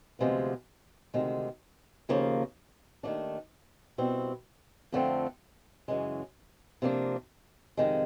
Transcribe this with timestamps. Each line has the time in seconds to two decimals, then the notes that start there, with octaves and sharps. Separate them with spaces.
0.19 D2 C3 F3 G#3 B3
1.14 D2 C3 D#3 G#3
2.09 D#2 C#3 F3 A#3
3.03 D#2 D#3 F#3 A3 D4
3.98 B2 G3 C4 E4
4.92 F2 D3 F3 A3 C4
5.88 F#2 C#3 E3 G#3
6.82 C3 F3 A#3 D4
7.77 F2 C3 D#3 G#3